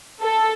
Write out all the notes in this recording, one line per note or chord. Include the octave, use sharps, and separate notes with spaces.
A4